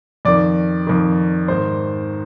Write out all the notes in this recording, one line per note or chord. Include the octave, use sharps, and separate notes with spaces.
F2 D#3 D5
F2 D#3
G#2 D#3 C5